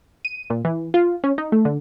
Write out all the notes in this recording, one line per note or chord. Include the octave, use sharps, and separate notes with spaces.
D#7
A#2
E3
F4
C#4
D#4
A3
D3